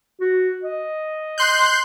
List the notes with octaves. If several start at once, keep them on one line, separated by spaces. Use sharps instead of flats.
F#4
D#5
C6 F#6 G6